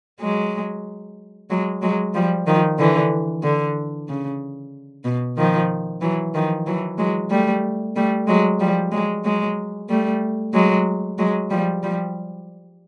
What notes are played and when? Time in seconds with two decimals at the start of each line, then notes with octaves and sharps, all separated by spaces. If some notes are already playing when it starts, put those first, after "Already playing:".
0.20 F#3 G#3
1.50 F#3 G#3
1.82 F#3 G#3
2.14 F3 G3
2.47 D#3 F3
2.79 D3 E3
3.43 D3
4.08 C#3
5.05 B2
5.37 D#3 F3
6.01 E3 F#3
6.34 D#3 F3
6.67 E3 F#3
6.98 F#3 G#3
7.30 G3 A3
7.96 G3 A3
8.28 F#3 G#3
8.60 F3 G3
8.92 F#3 G#3
9.24 F#3 G#3
9.90 G3 A3
10.54 F#3 G#3
11.19 F#3 G#3
11.50 F3 G3
11.83 F3 G3